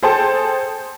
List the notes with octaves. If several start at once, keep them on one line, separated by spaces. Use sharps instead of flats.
G#4 A4 C5 G5 A5